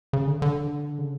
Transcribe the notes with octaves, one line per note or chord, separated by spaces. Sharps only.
C#3
D3
D3
C#3